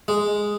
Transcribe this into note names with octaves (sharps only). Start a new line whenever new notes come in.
G#3